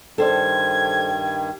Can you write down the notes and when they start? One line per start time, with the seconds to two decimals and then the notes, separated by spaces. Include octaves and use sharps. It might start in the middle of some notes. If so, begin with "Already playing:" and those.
0.18 G2 D#3 G3 A4 C5 D5 G#6